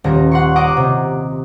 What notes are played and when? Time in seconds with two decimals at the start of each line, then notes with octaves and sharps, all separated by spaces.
0.04 D#1 A#5
0.31 F#5 C6 C#6
0.56 D#5 F#5 A#5 D6
0.77 C3